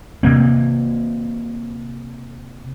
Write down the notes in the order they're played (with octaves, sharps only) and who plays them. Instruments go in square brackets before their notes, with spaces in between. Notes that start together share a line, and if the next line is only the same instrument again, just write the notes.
[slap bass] C3 A#3 C4